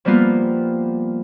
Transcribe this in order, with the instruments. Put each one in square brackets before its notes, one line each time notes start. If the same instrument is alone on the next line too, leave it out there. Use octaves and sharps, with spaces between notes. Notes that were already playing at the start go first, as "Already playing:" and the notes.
[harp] F3 G3 A#3 B3 F4